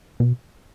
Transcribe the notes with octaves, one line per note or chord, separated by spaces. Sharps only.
B2